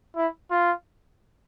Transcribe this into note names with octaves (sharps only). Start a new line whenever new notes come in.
E4
F4